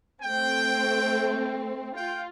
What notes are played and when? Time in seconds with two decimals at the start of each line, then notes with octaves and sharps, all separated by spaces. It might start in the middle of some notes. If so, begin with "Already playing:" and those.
0.23 A3 C4 G5
1.96 F4 G5